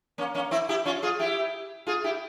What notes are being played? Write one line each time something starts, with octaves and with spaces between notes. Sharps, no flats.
A#3 C#4
A#3 C#4
C4 E4
E4 G4
C#4 F4
F4 G#4
E4 G4
F4 G#4
E4 G4